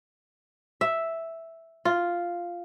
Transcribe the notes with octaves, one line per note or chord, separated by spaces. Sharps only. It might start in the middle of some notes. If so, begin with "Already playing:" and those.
E5
F4